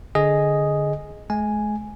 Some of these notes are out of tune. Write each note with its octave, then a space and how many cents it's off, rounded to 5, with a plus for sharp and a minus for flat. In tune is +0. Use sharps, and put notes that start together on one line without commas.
D3 +0 G#4 +0 D#5 +0
G#3 +40 G#5 +0